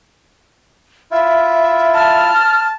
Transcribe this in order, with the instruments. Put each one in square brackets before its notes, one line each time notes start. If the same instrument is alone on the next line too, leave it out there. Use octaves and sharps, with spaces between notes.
[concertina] E4 F4 [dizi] E5
[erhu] A5 [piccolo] F6